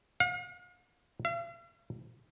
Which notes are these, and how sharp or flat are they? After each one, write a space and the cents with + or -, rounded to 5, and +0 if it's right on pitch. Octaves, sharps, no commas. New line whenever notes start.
F5 +45
F5 -45